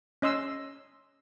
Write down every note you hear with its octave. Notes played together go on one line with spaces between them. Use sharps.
C#4 D#5 C6 E6